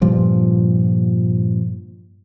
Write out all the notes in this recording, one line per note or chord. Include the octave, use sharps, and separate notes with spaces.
G2 A#2 F3 G3